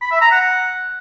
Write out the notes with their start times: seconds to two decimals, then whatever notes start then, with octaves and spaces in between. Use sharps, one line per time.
0.02 B5
0.11 E5
0.21 A#5
0.31 F#5